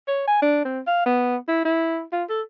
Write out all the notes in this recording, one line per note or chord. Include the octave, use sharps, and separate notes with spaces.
C#5
G#5
D4
C4
F5
B3
E4
E4
F4
A4